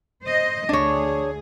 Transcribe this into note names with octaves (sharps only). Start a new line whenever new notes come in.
C5 D#5
D2 D4 G#4 C#5